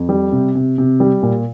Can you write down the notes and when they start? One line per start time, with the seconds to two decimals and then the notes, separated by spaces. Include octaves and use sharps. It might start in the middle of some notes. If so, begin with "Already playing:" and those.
Already playing: F2
0.09 G3
0.32 C3
0.55 C3
0.78 C3
1.00 G3
1.23 A#2